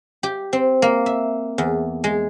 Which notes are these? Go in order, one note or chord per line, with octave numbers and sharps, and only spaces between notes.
G4
C4
A#3
E5
E2
G#3